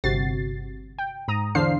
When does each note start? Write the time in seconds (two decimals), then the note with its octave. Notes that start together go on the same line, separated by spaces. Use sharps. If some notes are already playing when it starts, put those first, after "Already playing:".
0.04 G1 C3 F#4 A6 C7
0.99 G5
1.28 G#2 A#5 D#6
1.55 E2 D3 D4 C5 F5 C7